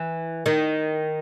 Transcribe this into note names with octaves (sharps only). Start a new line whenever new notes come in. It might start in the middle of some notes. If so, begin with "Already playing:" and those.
Already playing: E3
D#3